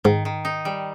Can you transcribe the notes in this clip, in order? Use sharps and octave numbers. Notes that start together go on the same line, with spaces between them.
G#2 D#3
D#3
D#4
G3